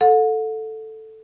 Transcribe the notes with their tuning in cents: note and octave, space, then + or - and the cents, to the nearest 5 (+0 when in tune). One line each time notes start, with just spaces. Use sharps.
A4 +0 F#5 -40